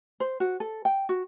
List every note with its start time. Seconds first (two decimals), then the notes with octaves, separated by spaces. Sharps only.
0.20 C5
0.40 F#4
0.60 A4
0.85 G5
1.09 F#4